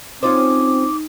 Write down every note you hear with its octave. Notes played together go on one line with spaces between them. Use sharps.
C4 C#4 D#4 F4 C5 D6